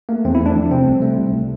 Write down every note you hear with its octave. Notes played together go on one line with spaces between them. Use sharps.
A3 A#3
E2 C4
E4
A3
D4
F3
C3 C4
C2
A3
C2